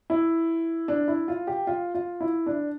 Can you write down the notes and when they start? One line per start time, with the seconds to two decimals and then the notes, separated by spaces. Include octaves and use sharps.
0.10 E4
0.88 D4
1.08 E4
1.28 F4
1.47 G4
1.67 F4
1.95 F4
2.21 E4
2.46 D4